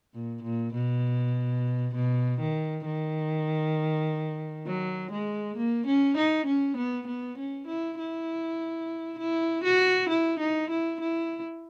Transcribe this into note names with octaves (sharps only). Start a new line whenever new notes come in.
A#2
A#2
B2
B2
D#3
D#3
F#3
G#3
A#3
C#4
D#4
C#4
B3
B3
C#4
E4
E4
E4
F#4
E4
D#4
E4
E4